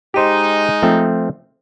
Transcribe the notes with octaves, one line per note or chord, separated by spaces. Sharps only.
G#3 D#4 G4 C5
F3 A3 C4